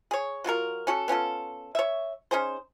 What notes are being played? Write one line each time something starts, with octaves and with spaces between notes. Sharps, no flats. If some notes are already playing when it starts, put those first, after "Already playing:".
G#4 C#5
F#3 F4 F#4 A#4
C#4 F#4 A4
B3 C#4 F4 A4
C#5 E5
C#4 D#4 G#4 C5